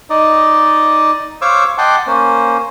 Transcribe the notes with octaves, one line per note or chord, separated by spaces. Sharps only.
D#4 D5 D#5
C5 C#5 F5 C#6 D6 E6
D#5 F#5 G5 A5 C6 D6
A#3 C#4 C5